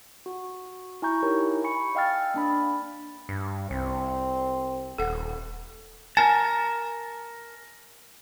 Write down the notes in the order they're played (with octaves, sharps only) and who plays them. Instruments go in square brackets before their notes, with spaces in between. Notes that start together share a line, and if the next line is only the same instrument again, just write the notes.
[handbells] F#4
E4 G#5 A#5 C#6 G6
D#4 E4 G4 A#4 C#5
G#5 B5 C#6 C#7
D#5 F5 G5 E6 F6 A6
A#3 D4 B5
[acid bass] G2
[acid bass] C2 [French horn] C4
[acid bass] D#1 [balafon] A4 F#5
[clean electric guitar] A#4 A5 [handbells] G#5